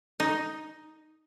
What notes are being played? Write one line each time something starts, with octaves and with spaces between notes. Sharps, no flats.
D#4